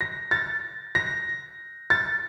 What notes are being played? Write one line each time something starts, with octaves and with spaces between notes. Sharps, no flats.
A#6
A6
A#6
A6